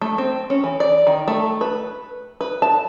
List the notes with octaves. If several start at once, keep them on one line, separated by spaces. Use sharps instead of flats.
A3
C4
C#4
E3
D5
D#3
A3
B4
B4
A5